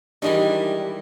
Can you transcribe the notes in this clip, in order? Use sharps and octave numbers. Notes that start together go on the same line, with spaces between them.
D#3 E3 G3 G#3 D4 D#4 G4 A#4